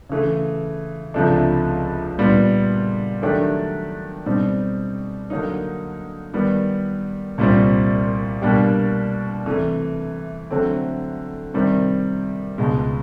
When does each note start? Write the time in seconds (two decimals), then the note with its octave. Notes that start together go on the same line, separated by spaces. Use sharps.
0.09 C#3 E3 A3
1.14 C#2 C3 F3 A3 D4
2.18 A#2 G3 B3
3.22 D#3 F#3 A3 D4 G4
4.26 B2 G3 C4 D#4
5.30 D3 F#3 A#3 D#4
6.34 D#3 G3 B3
7.38 C2 A#2 G3 C4
8.42 B2 G3 A#3 D4 G4
9.46 C3 E3 A3
10.50 D3 F#3 A3 C4
11.54 C3 D#3 G3 C4
12.58 C#2 B2 G#3